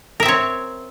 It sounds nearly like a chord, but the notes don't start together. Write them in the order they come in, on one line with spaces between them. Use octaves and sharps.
A#4 E5 C4 C#5